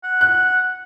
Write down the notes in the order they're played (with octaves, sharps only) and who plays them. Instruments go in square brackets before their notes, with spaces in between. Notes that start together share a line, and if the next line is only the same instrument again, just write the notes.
[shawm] F#5
[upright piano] F#6